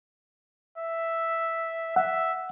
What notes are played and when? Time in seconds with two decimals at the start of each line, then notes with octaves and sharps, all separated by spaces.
0.78 E5
1.96 E5 F#5